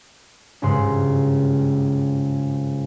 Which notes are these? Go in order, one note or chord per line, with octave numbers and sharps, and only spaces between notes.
G#1 C#2 G2 G#3 C6 F#6